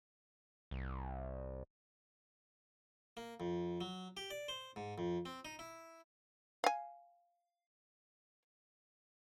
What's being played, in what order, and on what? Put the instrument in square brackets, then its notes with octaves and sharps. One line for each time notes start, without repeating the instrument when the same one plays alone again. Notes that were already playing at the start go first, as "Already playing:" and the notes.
[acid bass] C2
[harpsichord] A#3
F2
F#3
G4
D5
C5
G#2
F2
C4
D#4
E4
[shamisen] F5 G#5